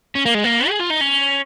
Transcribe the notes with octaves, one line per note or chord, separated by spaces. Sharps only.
C#4
A#3
G#3
A#3
G#4
F4
D#4
C#4